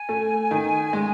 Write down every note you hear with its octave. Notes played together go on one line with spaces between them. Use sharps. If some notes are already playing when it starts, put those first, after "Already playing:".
Already playing: G#5
A3
D#3
G#3